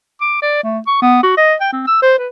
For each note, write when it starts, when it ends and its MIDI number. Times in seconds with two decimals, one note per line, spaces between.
0.21 0.39 86
0.42 0.59 74
0.63 0.79 57
0.87 0.99 85
1.02 1.20 59
1.23 1.34 66
1.37 1.54 75
1.61 1.71 79
1.72 1.83 60
1.87 2.02 88
2.02 2.15 72
2.18 2.28 71